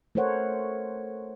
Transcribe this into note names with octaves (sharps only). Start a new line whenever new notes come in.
A3 A4 A#4 C5 C#5 F#5